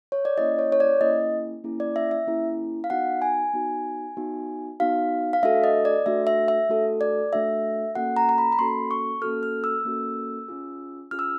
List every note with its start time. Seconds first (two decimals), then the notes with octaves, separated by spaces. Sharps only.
0.12 C#5
0.25 D5
0.38 A#3 C#4 E4 G#4 D#5
0.59 C#5
0.72 C#5
0.80 D5
1.01 A#3 C#4 E4 G#4 D#5
1.64 A#3 C#4 E4 G#4
1.80 D5
1.96 E5
2.11 E5
2.27 A#3 C#4 E4 G#4
2.84 F5
2.90 B3 D#4 F#4 F#5
3.22 G#5
3.54 B3 D#4 F#4
4.17 B3 D#4 F#4
4.80 B3 D#4 F#4 F5
5.33 F5
5.43 A3 D4 F#4 A4 E5
5.64 D#5
5.85 D5
6.06 A3 D4 F#4 A4 E5
6.27 E5
6.48 E5
6.69 A3 D4 F#4 A4
7.01 D5
7.33 A3 D4 F#4 A4 E5
7.95 A#3 C#4 F#4 A4 F#5
8.17 A#5
8.29 A#5
8.38 B5
8.52 B5
8.59 A#3 C#4 F#4 A4 C6
8.91 C#6
9.22 A#3 C#4 F#4 A4 F6
9.43 F6
9.64 E6
9.85 A#3 C#4 F#4 A4
10.48 C#4 F4 G#4
11.11 C#4 F4 G#4 F6
11.19 E6